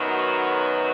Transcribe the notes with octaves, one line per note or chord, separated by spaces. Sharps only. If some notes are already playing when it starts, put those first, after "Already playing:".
Already playing: F#2 D#3 F#3 B3
F#4